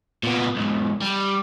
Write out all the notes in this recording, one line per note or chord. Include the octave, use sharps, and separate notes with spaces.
A#2 B3
B1 G#2
G3